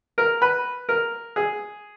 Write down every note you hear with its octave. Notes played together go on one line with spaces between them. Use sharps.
A#4
B4
A#4
G#4